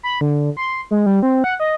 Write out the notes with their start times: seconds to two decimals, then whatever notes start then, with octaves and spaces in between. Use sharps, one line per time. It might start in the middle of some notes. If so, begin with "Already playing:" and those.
0.03 B5
0.21 D3
0.57 C6
0.91 G#3
1.06 G3
1.23 C4
1.44 F#5
1.60 D#5